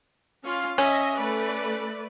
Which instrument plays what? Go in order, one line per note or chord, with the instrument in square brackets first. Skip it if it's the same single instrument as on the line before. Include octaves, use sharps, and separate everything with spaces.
[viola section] C#4 F4 F5
[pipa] C#4 [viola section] D#5 E5
[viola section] A3 B4 D5